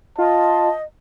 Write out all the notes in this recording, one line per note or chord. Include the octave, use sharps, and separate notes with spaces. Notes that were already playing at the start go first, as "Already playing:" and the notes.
F4 D#5 A5